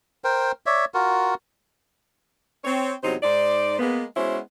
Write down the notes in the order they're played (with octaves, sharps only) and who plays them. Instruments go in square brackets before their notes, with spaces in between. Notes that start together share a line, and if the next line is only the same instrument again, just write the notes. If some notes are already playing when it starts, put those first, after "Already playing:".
[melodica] A#4 C5 G5
C#5 D5 E5
F4 F#4 A#4
[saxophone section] C4 C#5
E2 C3 F#3 D#4 C5
G#2 D#4 C5 D5
G#3 A#3 B3
G#3 B3 C#4 E4 F#4 C5